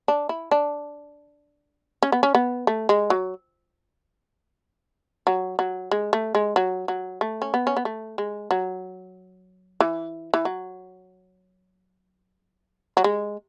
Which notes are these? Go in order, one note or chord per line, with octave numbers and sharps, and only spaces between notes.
D4
E4
D4
C#4
B3
C#4
B3
A3
G#3
F#3
F#3
F#3
G#3
A3
G#3
F#3
F#3
A3
C#4
B3
C#4
B3
A3
G#3
F#3
E3
E3
F#3
F#3
G#3